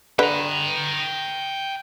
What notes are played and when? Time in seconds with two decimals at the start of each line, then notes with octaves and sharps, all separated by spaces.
0.19 D3 B4 G5 A#5